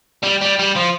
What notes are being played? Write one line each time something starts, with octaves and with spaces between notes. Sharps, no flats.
G3
G3
G3
F3